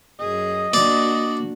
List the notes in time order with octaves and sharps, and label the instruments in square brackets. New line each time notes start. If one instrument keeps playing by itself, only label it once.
[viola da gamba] F#2 G#4 [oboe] D#5
[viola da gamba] A#3 D4 F#4 [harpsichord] D5